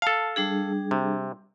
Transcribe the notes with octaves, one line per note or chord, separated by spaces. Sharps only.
A4 F5 A5
G3 D4 G#4
C3